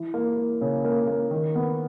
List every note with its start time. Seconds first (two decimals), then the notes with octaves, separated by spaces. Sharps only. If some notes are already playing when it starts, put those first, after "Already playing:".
Already playing: E3
0.14 A#3
0.37 A#3
0.61 C#3
0.84 A#3
1.07 A#3
1.31 D#3
1.55 B3